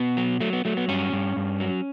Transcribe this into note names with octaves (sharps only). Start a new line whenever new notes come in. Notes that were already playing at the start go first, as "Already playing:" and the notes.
Already playing: B2 B3
F#3
F#3 A3
B3
F#3 A3
B3
G2 C#4
G2
G2
F#3